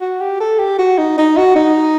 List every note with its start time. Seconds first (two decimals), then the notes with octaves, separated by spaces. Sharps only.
0.01 F#4
0.21 G4
0.40 A4
0.59 G4
0.79 F#4
0.98 D#4
1.18 D#4
1.37 F#4
1.56 D#4